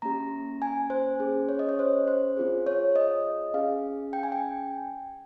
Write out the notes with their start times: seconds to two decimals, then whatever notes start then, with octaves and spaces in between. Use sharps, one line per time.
0.02 A#3 C#4 G4 A#5
0.62 G#5
0.90 C5
1.20 C#4 G#4
1.49 C#5
1.59 D#5
1.69 C#5
1.79 C5
2.08 C5
2.37 C4 F4 G#4
2.67 C#5
2.96 D#5
3.54 C#4 G#4 F5
4.13 G5
4.23 G#5
4.32 G5